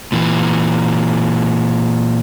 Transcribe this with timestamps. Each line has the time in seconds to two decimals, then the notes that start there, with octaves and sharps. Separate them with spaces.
0.12 A#2 E3